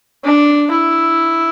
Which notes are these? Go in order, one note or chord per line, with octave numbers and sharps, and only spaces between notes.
D4
E4